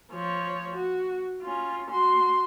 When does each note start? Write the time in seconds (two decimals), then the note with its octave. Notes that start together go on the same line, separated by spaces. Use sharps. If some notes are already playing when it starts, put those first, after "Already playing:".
0.12 F3 C#5
0.75 F#4
1.43 C#4 F4
1.90 F#4 C6